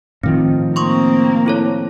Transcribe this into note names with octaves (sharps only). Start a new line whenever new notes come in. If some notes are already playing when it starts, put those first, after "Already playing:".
A2 D#3 F3 C4
A#3 C4 C6 C#6 D#6
E4 A4 C#5